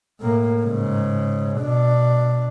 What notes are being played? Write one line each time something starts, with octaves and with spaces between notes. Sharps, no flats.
A2 A#3
G#2 C#3
B2 D4